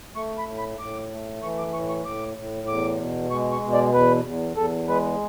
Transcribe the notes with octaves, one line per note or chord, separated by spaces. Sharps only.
A3 C#6
B5
A2
B5
A2 D6
A3
E3 C#6
D6
A2 C#6
C#6
A2 D6
A2
E2 D6
B2
G#3 C#6
C#6
B2
D5
E2 B4
E2
E2 A4
G#3 B4